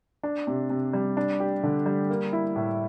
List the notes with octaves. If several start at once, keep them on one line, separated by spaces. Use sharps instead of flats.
D4
C3
C3
G3
D4
G4
D3
G3
A#3
E4
A2